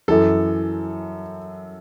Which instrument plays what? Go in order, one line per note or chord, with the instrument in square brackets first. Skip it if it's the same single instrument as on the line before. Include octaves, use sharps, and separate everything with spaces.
[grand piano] F#2 E3 A4